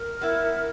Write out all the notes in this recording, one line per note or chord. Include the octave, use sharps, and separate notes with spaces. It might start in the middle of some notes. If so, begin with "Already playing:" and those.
Already playing: A#4
B3 E4